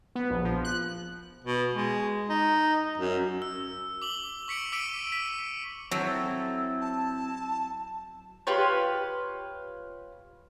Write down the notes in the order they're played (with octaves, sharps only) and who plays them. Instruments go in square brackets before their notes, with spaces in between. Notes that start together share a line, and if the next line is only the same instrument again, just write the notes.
[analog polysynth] B3
A#1
F3
F#6
[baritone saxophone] B2
G#3
D#4
F#2
[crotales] E6
D6 F#7 G7
C#6 B6 C#7 D7
D6 E6 B6 D7 D#7
B6
[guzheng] F#3 [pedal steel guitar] C4 E4 A4
[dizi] A5
[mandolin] F4 G4 B4 C#5